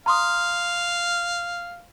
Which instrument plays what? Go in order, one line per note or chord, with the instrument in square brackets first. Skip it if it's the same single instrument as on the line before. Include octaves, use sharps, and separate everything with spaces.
[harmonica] F5 [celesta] A#5 C6 D#6